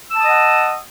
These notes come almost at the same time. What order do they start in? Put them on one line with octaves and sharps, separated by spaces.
E6 A5 D#6 D#5 F#5